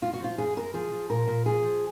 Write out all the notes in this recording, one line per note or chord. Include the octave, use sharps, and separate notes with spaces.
F#2 F4
F#4
F3 F4
F#2 G#4
F#2 A#4
F3 G#4
F3
A#2 A#4
A#2
F3 G#4
F3